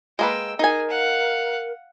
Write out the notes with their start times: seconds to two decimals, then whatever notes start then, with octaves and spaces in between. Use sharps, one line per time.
0.19 G#3 A#3 B4 G5 E6
0.59 D#4 G#4 A#4 G#5
0.90 F5 F#5